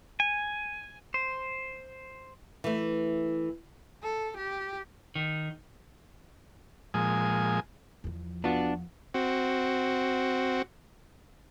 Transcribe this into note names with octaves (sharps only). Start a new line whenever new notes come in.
G#5
C5
E3 A3
A4
G4
D#3
A#2 F3 G#3 G#5 D#6
E2 F3
B3 D4 F4 F#4
C4 F#4